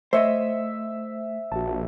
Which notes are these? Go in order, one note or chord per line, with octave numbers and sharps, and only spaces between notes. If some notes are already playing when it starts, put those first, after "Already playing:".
A3 C5 C#5 D#5 E5
A#1 F#4 A5